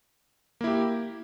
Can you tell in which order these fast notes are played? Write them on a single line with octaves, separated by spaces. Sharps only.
A#3 E4 G4